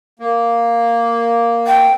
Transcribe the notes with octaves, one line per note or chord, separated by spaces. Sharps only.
A#3
G5